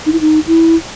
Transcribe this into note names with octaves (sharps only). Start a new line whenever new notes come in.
D#4
E4
D#4
E4